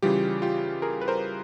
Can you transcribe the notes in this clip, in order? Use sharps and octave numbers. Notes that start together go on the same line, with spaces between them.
C#3 E3 G3 F4 G4
F4 G4
G#4 A#4
B4
A#4 C5